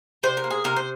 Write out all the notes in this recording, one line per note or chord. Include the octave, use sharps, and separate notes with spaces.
C3 C5
A#4
A#3
G#4
C3 A#4
C5